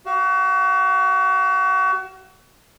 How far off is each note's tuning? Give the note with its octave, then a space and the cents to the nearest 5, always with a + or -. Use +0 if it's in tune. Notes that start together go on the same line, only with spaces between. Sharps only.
F#4 +35 F5 +0